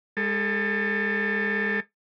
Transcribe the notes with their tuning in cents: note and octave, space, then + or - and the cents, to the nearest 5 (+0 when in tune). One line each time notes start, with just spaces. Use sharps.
G#3 -30 A4 +20